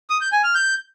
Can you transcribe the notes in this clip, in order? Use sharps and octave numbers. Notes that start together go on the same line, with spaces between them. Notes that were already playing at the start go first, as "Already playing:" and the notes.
D#6
G6
G#5
F6
G6